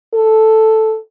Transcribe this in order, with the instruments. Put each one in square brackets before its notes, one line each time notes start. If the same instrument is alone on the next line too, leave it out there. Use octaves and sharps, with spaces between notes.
[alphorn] A4